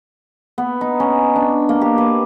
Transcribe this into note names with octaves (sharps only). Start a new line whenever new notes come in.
B3
D#4
C#4
D4
A#3
G4
B4